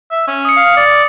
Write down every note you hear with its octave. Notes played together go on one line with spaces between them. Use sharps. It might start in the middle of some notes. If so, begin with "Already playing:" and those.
E5
C#4
D#6 C#7
F5
D5